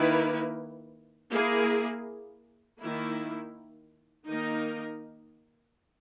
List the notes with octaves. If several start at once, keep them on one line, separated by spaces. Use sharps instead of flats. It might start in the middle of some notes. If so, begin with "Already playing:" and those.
Already playing: D#3 A#3 E4 B4
A#3 E4 G#4
D#3 A#3 E4
D#3 A#3 D#4 A#4 D#5